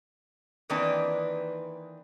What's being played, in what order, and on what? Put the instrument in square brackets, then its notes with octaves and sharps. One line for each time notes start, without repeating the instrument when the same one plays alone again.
[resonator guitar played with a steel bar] D#3 E3 A#3 C4 D4 B4